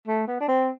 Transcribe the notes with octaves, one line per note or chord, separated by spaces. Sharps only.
A3
B3
D4
C4